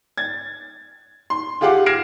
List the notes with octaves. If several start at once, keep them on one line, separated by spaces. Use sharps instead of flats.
G#6 A6
C6
F4 G4 G#4 F5 F#5 D6
F6 G#6 A#6 C7 D7 E7